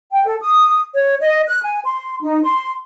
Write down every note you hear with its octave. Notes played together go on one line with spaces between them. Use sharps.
G5
A4
D#6
C#5
D#5
F#6
G#5
C6
D#4
C6